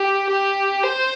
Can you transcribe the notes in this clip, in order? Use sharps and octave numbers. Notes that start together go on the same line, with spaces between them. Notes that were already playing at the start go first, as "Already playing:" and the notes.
Already playing: G4
G4
C5